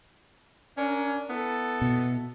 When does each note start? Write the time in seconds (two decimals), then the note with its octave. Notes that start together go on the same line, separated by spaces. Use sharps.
0.78 C#4 D4 A#4
1.30 B3 E4 A4
1.82 B2